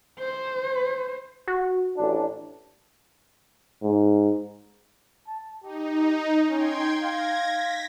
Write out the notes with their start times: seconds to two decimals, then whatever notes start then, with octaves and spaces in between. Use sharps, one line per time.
0.19 C5
1.48 F#4
1.97 A1 D4
3.82 G#2
5.27 A5
5.63 D#4 G4
6.50 C#4 G5 C6 G#6
7.02 F5 G#6 A#6
7.48 A#6 B6